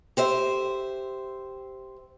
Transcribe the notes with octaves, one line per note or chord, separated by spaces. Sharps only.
G4 C5 E5